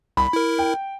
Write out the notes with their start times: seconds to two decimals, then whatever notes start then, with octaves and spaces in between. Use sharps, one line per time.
0.17 C2 B5
0.33 E4 A#4
0.59 G5